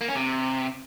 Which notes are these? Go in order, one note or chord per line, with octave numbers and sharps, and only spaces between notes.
A#3
C#4
C3